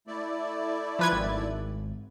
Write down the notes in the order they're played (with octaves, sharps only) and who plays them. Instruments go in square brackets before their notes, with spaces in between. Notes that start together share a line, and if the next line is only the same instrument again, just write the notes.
[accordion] A3 E4 D5
[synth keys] F3 B4 G#6
G#1